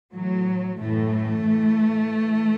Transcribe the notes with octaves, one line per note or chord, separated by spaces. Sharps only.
A2 E3 F#3
F#2 A2 E3 A3
A2 E3
A2 E3